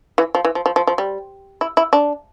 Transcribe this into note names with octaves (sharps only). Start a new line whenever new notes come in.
E3
F3
E3
F3
F3
F3
F3
G3
E4
E4
D4